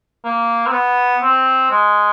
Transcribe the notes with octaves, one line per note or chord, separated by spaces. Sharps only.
A#3
C4
B3
C4
G#3